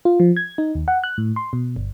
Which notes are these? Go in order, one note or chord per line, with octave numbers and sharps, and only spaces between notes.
F4
F3
G#6
D#4
D#2
F#5
F#6
A2
C6
B2
G1